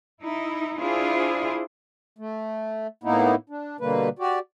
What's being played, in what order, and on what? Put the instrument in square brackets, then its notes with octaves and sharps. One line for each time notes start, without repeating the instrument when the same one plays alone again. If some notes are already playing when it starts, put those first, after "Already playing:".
[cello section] D#4 E4
D4 E4 F4 G#4 C5
[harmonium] A3
A2 A#3 B3 D#4 E4
D4
B2 D3 G3 A#3 B4
F#4 G4 D5